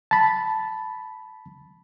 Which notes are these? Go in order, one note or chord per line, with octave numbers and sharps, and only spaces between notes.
A5 B5